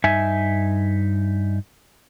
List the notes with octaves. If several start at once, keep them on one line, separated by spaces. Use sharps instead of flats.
G2 D#4 E5 G#5